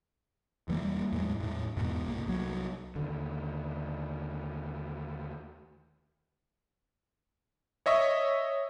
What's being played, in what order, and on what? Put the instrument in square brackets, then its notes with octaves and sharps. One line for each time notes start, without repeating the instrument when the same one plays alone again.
[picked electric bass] E1 E3 G3 A#3
E2 A2 F#3 G#3
E2 A2
E2 G#2 B2
C2 A#3
C2 F#3
[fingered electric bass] D#2 D3
[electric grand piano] C#5 D#5 E5 C#6